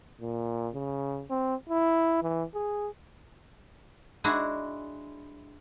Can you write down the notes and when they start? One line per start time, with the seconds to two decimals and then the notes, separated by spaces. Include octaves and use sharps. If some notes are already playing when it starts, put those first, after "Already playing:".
0.21 A#2
0.74 C#3
1.30 C4
1.69 E4
2.23 E3
2.55 G#4
4.24 G#3 D4 E4 F#4